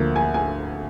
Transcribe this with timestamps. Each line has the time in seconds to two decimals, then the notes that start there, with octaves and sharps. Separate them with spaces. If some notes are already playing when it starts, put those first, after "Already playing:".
Already playing: D2 D3 F3 A#3
0.16 G#5
0.34 G#5